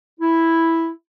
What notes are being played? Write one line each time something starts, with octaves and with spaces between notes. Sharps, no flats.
E4